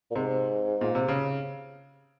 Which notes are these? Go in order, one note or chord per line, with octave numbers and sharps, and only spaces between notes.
A#2
G#2 C3
A#2
C3
C#3